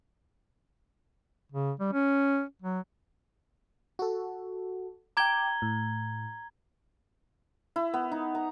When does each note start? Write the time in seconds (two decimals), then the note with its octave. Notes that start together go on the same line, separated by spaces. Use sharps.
1.52 C#3
1.80 G3
1.93 C#4
2.62 F#3
3.99 F#4 A4
5.17 G5 A#5 D6 G#6 G7
5.62 A2
7.76 E4
7.94 B3
8.12 D#4
8.35 A#5